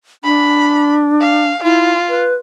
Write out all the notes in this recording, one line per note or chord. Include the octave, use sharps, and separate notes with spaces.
D4 B5
F5
E4 F4
B4